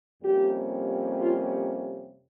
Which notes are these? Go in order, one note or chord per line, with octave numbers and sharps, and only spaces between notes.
F2 C3 G3 A#3 C#4 G4
F4